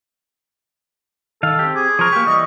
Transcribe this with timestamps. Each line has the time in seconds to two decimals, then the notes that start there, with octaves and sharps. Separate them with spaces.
1.43 D#3 A4 F5
1.59 C4 G4
1.75 G#4 D6
1.99 F3 A#4 C#6
2.13 A#3 G4
2.26 E3 G3 D#5